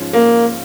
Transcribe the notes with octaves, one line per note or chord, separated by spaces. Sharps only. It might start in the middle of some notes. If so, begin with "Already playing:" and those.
Already playing: G#2 F3 C#4 F4
A#3